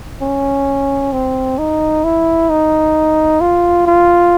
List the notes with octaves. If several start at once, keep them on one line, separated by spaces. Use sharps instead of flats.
C#4
C4
D#4
E4
D#4
F4
F4